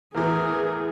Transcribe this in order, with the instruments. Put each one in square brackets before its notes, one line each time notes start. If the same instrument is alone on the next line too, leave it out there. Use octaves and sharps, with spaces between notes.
[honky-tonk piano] E2 A2 E3 [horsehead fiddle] G#4 [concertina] A#4